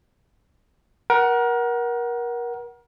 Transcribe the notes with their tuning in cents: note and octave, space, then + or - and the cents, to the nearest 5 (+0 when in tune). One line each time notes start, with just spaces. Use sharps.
A#4 +30 F#5 +15